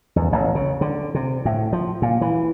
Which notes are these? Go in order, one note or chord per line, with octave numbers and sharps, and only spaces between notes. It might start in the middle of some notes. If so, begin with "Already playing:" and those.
E2
A1
C#3
D3
C3
A2
F3
A#2
E3